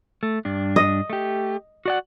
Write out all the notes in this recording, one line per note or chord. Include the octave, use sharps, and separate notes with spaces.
A3
G2 D4
D#5
A3 G4
F#4 D5 F#5